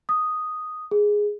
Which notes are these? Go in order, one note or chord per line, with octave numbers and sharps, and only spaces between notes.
D#6
G#4